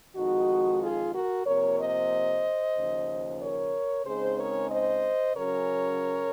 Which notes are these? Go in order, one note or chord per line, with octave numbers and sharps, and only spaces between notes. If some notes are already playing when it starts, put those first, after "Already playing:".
F2 D#3 G#3 D#4 F#4
F4 G#4
F#4 A#4
C3 F3 A#3 A#4 C#5
C5 D#5
D#2 C#3 F3
A#4 C#5
C#3 G#3 C4 D#4 G#4 C5
A#4 C#5
C5 D#5
C#3 F#3 C#4 A#4 C#5